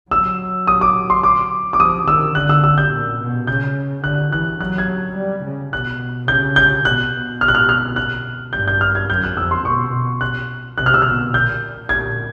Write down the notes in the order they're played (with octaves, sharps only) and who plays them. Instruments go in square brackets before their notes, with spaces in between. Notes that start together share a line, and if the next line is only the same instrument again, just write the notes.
[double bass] F#3 [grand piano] E6
[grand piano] D#6
D6
C6
D6
D6
[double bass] F3 [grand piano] D#6
[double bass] D#3 [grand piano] E6
[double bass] D3 [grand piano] F#6
[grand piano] E6
E6
G6
[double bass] A#2
B2
[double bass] C#3 [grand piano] G6
[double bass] D3 [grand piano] F#6
[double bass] E3 [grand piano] F#6
[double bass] F#3 [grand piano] F#6
[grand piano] G#6
[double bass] G3
C#3
[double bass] B2 [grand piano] F#6
[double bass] C#3 [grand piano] G6
[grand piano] G6
[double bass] B2 [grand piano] F#6
[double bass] B2
[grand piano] F6
F#6
F6
F6
F#6
[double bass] G2 [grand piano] G6
[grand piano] G6
F6
G#6
[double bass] F#2 [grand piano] G6
[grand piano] F#6
[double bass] F2 [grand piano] E6
[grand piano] C6
[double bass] B2 [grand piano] C#6
[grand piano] F#6
[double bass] C3 [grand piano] F#6
[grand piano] F6
E6
[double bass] B2 [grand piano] F6
[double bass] A#2 [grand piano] G6
[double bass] A#2 [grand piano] G#6